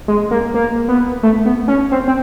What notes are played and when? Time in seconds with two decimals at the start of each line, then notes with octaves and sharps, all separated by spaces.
0.08 G#3
0.31 A#3
0.54 A#3
0.89 B3
1.23 A3
1.46 B3
1.68 C#4
1.92 C4
2.08 C4